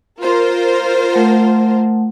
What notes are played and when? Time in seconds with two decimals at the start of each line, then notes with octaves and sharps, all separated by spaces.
0.23 F4 A#4 C5
1.13 A3 F#5